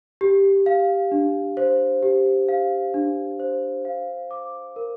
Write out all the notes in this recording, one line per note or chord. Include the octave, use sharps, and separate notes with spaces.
G4
F5
D4
C5
G4
F5
D4
C5
F5
D6
A#4